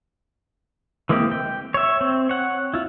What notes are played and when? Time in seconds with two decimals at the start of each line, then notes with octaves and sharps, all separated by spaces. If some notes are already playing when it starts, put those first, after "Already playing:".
1.09 E3 G#3 A#3 C4 G4
1.31 G5
1.74 C#5 E5
2.01 C4
2.29 C#5 F#5
2.74 E4 F4